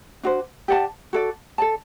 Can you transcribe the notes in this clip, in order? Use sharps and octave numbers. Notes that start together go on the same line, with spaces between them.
D4 F#4 C5
G4 D5 F#5 A5
F#4 A4 D5
A4 D5 A5